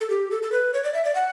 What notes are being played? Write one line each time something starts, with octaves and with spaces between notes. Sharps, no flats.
A4
G4
A4
A4
B4
C#5
D5
E5
D5
F#5